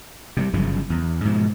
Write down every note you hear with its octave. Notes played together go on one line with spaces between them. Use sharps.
C3 F#3 G3
G1 F#2 C#3 F3
E2
G#2 B2 F3